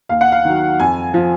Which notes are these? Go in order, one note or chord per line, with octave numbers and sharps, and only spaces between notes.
D#2 F5
F#5
F5
D#3 F#3
F2 G#5
F3